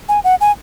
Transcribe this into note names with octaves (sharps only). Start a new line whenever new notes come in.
G#5
F#5
G#5